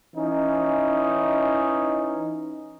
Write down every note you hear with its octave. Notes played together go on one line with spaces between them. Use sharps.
E3 C#4 D#4